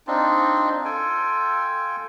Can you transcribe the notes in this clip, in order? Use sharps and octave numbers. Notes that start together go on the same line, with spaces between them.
C4 D4 D#4 F4
F4 A4 G5 G#5